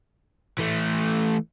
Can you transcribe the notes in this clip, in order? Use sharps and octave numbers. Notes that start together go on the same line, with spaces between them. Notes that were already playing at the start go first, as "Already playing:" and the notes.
E3 A3